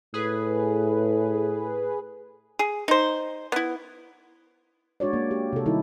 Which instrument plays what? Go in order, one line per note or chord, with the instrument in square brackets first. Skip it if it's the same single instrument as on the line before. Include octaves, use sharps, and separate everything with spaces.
[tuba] A2 [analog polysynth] G#4 B4
[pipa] G#4
D#4 C5
B3 E4
[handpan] G#3 D4 F#4 C#5 D5
A#3
G4
C3 A4
D#3 G3 D#4 E4 A4